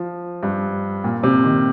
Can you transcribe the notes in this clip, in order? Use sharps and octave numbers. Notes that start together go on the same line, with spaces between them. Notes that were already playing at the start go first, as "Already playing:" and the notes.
Already playing: F3
G2
A#2
C3
D#3